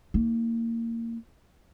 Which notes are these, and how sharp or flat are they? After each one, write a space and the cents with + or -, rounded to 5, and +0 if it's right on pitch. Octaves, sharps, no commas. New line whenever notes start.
A#3 -20 D#4 +25